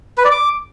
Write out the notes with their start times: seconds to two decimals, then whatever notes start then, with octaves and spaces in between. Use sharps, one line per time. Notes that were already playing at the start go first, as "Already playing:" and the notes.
0.18 B4
0.25 D5
0.31 D6